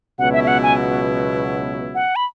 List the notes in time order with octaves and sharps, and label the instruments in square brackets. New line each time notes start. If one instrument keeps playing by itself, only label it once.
[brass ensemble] C#2 B2 F#3 B3 E4 [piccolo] F#5
[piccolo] E5
E5
F#5
G#5
F#5
B5